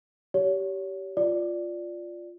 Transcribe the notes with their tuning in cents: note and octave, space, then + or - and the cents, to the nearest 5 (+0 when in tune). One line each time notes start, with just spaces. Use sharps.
G4 -20 C#5 +35
F4 +0 D5 +0